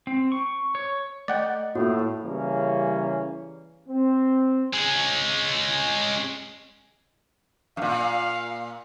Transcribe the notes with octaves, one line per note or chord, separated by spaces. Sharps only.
C4
C#6
C#5
A3 D5 D#5 F#5 G5
A2 A#3 F4 F#4
C#3 E3 G3 A#3 C#4
C4
G#3 C#4
F#2 A#2 F5